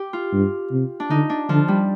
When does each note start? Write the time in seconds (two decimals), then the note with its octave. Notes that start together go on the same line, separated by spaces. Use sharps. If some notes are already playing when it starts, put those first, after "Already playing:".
Already playing: G4
0.13 F4
0.33 G2
0.71 C3
1.00 D4
1.09 D3 D#4
1.30 D4
1.49 D3 F3
1.68 G3